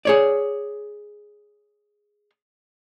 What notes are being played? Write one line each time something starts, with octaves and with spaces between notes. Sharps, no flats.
G#4 C#5 D5